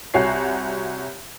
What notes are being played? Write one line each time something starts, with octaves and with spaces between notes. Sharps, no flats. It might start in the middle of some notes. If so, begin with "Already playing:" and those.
C2 F#4 C#5 G#5 C7